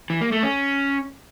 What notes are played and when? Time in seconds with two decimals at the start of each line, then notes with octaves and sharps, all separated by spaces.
0.10 E3
0.21 A#3
0.32 A3
0.43 C#4